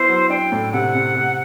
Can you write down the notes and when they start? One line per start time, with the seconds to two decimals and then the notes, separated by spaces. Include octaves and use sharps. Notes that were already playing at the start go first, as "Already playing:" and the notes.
Already playing: B3 E4 C5
0.09 F#3
0.30 D4 G5
0.52 A2
0.73 C3 F#5
0.95 C3
1.15 C3